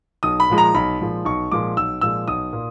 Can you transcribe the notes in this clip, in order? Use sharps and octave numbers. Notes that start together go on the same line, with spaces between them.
B1 D#6
B5
A#2 F3 G#3
A#5
B1 B5
A#2 F3 G#3
B1 C#6
A#2 F3 G#3 D6
B1 E6
A#2 F3 G#3 E6
B1 D#6
A#2